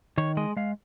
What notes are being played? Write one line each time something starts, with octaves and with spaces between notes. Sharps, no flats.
D#3 C#5
G#3 D#5
G#3 F5